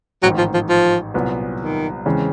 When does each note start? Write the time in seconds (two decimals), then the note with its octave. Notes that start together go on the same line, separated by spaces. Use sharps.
0.23 A1 G#2 D#3 F#3
0.38 F3
0.54 F3
0.69 F3
1.14 C2 A#2 F#3 B3
1.60 D#3
2.06 E2 C#3 E3 G#3 C4